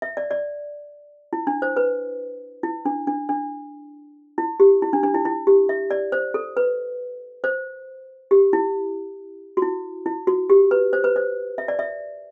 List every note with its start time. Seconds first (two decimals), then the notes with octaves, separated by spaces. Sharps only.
0.02 E5
0.17 D5
0.31 D5
1.33 E4
1.47 D4
1.62 C5
1.76 B4
2.63 E4
2.85 D4
3.07 D4
3.29 D4
4.38 E4
4.60 G4
4.82 E4
4.93 D4
5.03 D4
5.14 E4
5.25 E4
5.47 G4
5.69 E5
5.91 D5
6.12 C5
6.34 A4
6.57 B4
7.44 C5
8.31 G4
8.53 E4
9.57 F#4
9.62 E4
10.06 E4
10.27 F#4
10.50 G4
10.71 B4
10.93 C5
11.04 B4
11.16 C5
11.58 E5
11.68 D5
11.79 E5